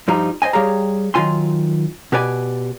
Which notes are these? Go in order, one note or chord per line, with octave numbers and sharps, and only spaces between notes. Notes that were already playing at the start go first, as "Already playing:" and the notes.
G2 F3 G3 D#4 A#5
C5 D5 D#5 G#5
G3 G4 G#4 C#5 F5 A#5
D#3 F#3 F4 G#5 C6
B2 G4 B4 D5 G#5